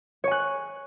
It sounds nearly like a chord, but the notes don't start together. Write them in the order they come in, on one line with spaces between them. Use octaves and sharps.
C#5 G#5 F#6